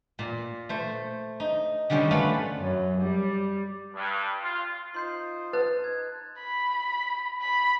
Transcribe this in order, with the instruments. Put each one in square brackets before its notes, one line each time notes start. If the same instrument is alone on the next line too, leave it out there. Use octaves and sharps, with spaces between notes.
[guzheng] A#2
A3 C5
D#4
D3 D#3 G3 C#4 C5
A3 F4 B4 F5 F#5 B5
[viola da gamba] F#2
G3
[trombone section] G2
F4
[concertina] D#4 F4 C5 [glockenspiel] C6 G6 C7
[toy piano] B4 [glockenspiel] A5 F#6 A6
[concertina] D#4 [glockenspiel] G#6
[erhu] B5
B5